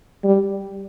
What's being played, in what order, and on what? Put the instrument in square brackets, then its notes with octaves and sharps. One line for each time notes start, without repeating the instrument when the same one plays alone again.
[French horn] G3